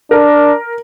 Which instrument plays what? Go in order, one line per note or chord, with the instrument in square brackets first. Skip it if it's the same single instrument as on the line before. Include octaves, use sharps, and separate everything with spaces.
[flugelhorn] D4 [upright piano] A#4